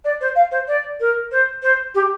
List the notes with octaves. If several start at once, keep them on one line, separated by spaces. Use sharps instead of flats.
D5
C5
F5
C5
D5
A#4
C5
C5
G4